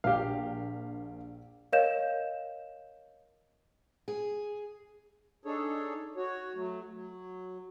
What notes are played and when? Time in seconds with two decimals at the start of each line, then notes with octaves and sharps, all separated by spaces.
0.04 A#1 G4 F5
1.73 A#4 C#5 D#5 F5 G6 E7
4.08 G#4
5.45 D4 D#4 G#4 A4 C#5
6.16 F#4 C#5
6.55 F#3 A3
6.93 F#3